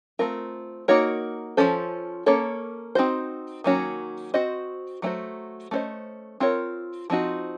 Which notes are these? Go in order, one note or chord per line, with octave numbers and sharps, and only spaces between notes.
A3 C4 F4 A#4
A#3 D#4 F#4 A#4 C#5
F3 A3 C#4 A4 C5
A#3 C#4 A4 C#5
C4 D#4 F#4 C5
D#3 F#3 A#3 C#4 F#4
C4 F#4 C5 D#5
F#3 A3 C#4 F#4 C5
A3 C#4 A4 C5 D#5
C4 F4 A#4 C#5
F3 C4 D#4 F#4